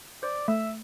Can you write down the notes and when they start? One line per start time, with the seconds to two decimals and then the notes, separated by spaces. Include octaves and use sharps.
0.22 C5 D5
0.48 A3 E5